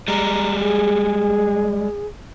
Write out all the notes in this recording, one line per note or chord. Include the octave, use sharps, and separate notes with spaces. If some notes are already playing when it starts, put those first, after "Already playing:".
G3 G#3 A#5
G#4